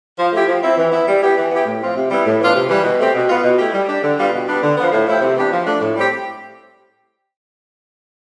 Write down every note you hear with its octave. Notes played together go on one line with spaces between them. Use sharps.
F3
A3 E4 G4
F3
C4 E4
E3
B3 E4
G3
B3 E4 G4
E3
B3 E4 G4
A2
F3 C4 F4
C3
G3 B3 E4
A2
E3 B3 D4 F4
C3
E3 G3
B2
A3 C4 G4
B2
B3 F4
B2
A3 E4 G4
G3
D4 G4
D3
G3 B3 F4
B2
G3 B3 D4
D3
F3 B3
A2
F3 A3 E4 G4
C3
E3 B3 D4 G4
F3
A3 D4
A2
G3 C4 G4